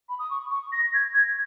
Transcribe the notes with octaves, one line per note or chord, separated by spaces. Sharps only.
B5
D#6
C#6
C#6
A#6
G#6
G#6